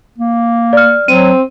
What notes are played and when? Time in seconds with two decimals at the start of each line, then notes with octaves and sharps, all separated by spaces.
0.18 A#3
0.73 D5 F6
1.08 F#3 C4 D#7